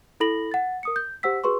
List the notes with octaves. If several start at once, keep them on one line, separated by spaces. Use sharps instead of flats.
E4 A4 B5 A#6 F#7
F#5 A6
A#4 D#6 C#7
G6
G4 C5 F#5 E6 B6
F#4 G#4 B4 C6 C#6